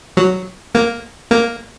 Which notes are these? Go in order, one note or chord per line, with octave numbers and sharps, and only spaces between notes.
F#3
A#3
A#3